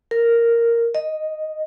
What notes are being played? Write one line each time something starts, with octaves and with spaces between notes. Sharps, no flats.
A#4
D#5